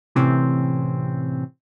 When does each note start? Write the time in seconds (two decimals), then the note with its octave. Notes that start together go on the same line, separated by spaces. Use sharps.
0.15 A2 C3 E3 C4 C#4